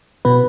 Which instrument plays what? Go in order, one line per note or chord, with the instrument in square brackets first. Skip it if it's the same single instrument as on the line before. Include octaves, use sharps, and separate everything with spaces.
[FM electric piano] B2 B3 B4